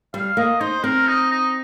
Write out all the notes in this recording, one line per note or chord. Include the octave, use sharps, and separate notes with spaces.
G3 F5
A#3 D#5
D#4 C5
C4 A#4
D#4
D#4